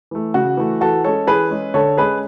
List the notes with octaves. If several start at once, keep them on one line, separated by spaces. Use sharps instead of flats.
E3 A3
C#3 F#4
E3 A3
E3 F#4 A4
G#3 C#4 A4 C#5
E3 G#4 B4
G#3 C#4
D3 A4 C#5
G#3 C#4 G#4 B4